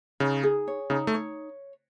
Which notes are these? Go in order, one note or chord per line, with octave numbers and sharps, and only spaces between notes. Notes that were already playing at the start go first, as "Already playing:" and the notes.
C#3 D#4
G#4
C#5
C#3 D#4
A3
C#5